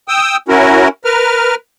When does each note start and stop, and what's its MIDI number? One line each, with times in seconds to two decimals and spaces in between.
0.08 0.37 79
0.08 0.37 87
0.08 0.37 88
0.48 0.88 61
0.48 0.88 64
0.48 0.88 66
0.48 0.88 70
1.05 1.55 70
1.05 1.55 71
1.05 1.55 89